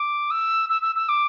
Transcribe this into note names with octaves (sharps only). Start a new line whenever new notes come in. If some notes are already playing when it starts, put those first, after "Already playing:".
Already playing: D6
E6
E6
E6
E6
D6